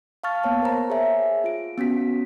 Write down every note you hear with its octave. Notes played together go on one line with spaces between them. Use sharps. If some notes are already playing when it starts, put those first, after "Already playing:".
F5 A5 C#6 F6 A6
A#3 B3 C#5 A5
A#4 C5 A#5
G#4 C#5 E5 G#5
F4 D7
B3 C#4 F#4 B6